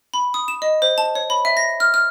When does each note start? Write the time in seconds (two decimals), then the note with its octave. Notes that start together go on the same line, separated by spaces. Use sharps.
0.14 B5
0.34 D#6
0.48 E7
0.62 D#5
0.82 C5
0.98 A5
1.15 C#5
1.30 B5
1.45 E5
1.57 A#6
1.80 F6
1.94 F6